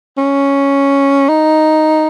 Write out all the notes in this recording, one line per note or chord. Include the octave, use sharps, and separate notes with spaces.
C#4
D#4